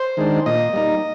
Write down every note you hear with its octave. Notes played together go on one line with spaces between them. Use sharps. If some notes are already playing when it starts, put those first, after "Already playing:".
Already playing: C5
D#3 G#3 D4
A#2 D#5
G3 A#3 D#4